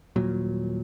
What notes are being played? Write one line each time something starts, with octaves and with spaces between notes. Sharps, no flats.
D#1 A#2 F#3